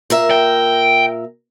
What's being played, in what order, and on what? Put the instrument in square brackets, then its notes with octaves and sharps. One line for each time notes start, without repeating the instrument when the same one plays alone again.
[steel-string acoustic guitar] A#2 A#4 E5
[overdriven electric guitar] G5